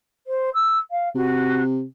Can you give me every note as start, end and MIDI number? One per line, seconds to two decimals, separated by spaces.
0.27 0.50 72
0.54 0.79 88
0.91 1.09 77
1.15 1.84 48
1.15 1.63 66